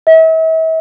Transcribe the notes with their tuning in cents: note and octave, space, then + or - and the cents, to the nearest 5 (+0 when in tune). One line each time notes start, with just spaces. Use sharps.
E5 -40